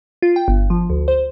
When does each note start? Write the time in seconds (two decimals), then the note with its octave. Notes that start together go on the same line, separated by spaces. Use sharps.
0.22 F4
0.36 G5
0.48 G1
0.70 F3
0.90 D2
1.08 C5